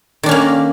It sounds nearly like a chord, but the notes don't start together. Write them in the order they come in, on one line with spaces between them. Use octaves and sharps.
D#3 D4 C#4 A#3